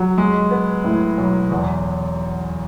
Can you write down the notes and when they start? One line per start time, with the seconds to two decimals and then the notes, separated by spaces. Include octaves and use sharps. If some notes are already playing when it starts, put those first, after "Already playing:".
Already playing: F#3
0.18 G#3
0.51 B3
0.84 A2
1.17 B1
1.51 E2